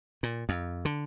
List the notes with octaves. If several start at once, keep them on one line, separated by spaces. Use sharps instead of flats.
A#2
F2
D3